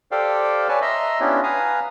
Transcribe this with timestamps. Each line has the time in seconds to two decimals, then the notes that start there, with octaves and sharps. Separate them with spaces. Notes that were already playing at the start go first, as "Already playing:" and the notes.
0.12 G4 A4 C5 D5 F5 G5
0.69 B4 C#5 D5 G#5 A5
0.82 D#5 E5 A#5 C6 E6
1.20 B3 C#4 D4 E4 F4 G4
1.43 B4 F5 G#5 A#5 D#6